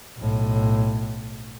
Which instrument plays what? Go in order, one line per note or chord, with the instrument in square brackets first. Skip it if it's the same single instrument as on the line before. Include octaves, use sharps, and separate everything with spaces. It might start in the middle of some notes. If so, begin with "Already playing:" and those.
[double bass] B1 A2